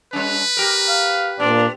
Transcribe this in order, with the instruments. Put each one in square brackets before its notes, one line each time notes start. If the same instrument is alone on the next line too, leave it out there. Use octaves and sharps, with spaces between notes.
[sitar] G3 C#4 [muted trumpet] B4
[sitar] G4 A#4
[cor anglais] F5
[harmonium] A#2 D5 [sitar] B3 [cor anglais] D4